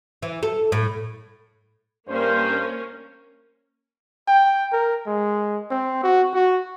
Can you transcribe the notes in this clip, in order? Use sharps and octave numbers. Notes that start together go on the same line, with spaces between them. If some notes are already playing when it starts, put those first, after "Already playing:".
E3
A4
A2
G2 A#3 C#4 A#4 C5
G5
A#4
G#3
C4
F#4
F#4